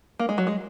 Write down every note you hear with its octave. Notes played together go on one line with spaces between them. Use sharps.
A#3
G#3
F#3
G#3